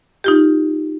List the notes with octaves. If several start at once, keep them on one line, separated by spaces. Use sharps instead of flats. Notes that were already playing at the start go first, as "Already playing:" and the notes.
D#4 F4 G4